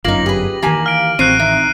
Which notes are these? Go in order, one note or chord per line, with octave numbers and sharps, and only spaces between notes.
G1 F#2 A#3 D#4 F4 A#6 F#7
G4 G#4 B4
D#3 E3 A#3 G4 G#5
F5 F6 D7
A1 F#3 C4 F#6 C7 D#7
D#3 E5